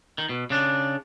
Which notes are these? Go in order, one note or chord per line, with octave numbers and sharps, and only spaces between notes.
D#3
B2
C#3 D4